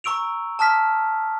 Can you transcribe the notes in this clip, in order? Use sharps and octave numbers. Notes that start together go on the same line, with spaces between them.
A#5 C#6 E6 D7 F7
A5 D#6 F6 B6